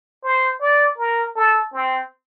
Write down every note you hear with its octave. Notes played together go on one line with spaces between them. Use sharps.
C5
D5
A#4
A4
C4